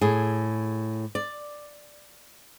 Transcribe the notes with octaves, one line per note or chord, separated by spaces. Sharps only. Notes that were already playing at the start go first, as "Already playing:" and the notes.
A2 G#4
D5